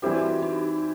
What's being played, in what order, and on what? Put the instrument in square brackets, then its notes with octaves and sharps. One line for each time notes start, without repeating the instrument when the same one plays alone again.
[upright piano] E3 G3 C4 E4 G4 [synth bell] F#4
[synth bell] D#4